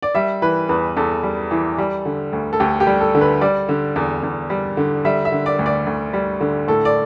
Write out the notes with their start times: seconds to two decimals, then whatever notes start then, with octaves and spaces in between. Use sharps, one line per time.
0.02 D5
0.15 G3 E5
0.42 E3 B4
0.69 E2 B4
0.97 E2 A4
1.23 G3
1.51 E3
1.78 G3
2.05 D3
2.33 D2
2.53 A4
2.60 D2 G4
2.80 G4
2.87 G3
3.01 A4
3.15 D3
3.21 B4
3.41 G3 D5
3.69 D3
3.96 E2
4.23 E2
4.50 G3
4.77 D3
5.05 G3 E5
5.25 E5
5.32 D3
5.46 D5
5.59 D2
5.66 D5
5.87 D2
6.13 G3
6.40 D3
6.68 A2 A4
6.85 D5